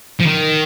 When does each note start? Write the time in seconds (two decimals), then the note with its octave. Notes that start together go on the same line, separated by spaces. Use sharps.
0.20 F3
0.26 D#3